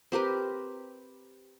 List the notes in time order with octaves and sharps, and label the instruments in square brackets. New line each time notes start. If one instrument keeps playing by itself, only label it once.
[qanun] C4 G4 A#4 B4